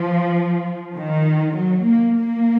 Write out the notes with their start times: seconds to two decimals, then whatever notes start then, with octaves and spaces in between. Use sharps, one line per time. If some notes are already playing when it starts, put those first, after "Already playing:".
Already playing: F3
0.97 D#3
1.56 F#3
1.85 A#3
2.15 A#3